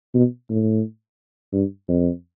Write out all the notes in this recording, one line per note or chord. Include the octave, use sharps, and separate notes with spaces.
B2
A2
G2
F2